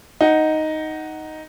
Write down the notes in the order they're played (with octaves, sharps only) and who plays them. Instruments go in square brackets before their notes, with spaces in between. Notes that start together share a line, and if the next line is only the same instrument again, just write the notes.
[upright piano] D#4 F#5